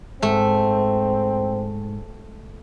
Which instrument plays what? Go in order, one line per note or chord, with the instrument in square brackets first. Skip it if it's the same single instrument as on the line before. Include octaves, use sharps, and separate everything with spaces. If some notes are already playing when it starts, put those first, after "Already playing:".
[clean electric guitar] G#2 [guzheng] A3 [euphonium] C4